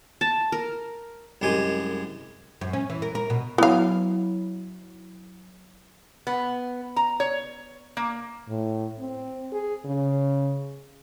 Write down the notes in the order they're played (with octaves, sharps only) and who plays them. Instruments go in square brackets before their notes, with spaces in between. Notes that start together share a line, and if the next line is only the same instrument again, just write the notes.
[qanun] A5
A#4
[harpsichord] C2 F#2 G#3 G4 G#5
[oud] F#2
C#4
E3
A#4
A#4
B2
[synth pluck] F#3 E4 [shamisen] B3 F5
[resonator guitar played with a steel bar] B3
A#5
C#5
A#3
[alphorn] A2
C4
G#4
C#3